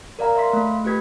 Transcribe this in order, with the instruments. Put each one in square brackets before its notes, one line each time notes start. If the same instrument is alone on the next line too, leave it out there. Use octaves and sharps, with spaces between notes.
[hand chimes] A#4 D5 F5 A#5
E5 F5 C6 B6
A3
A3 F4 G4 B4 G#6 B6